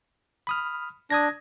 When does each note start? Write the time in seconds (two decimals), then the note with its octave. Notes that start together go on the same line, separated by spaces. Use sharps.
0.47 B5 D#6 F6
1.10 D4 D#6 G#6 A#6